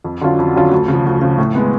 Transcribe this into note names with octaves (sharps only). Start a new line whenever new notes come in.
F2
D3 F#3 C#4 F4
F2
D3 F#3 C#4 F4
D2
C#3
F3
D2
C#3 F3
A2
G#3 B3